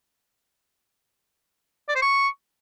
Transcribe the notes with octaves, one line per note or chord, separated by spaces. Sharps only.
D5
C5
C#6